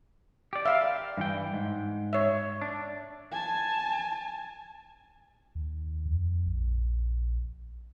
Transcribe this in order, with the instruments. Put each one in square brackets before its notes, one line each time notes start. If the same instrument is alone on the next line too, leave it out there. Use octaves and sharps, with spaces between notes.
[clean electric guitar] G4 D5
[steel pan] E5 F5
[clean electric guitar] G2 E3 G5
G#2
[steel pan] C#5 E5
[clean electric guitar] D4
[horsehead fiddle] G#5 A5
[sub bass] D#2
F2
A#1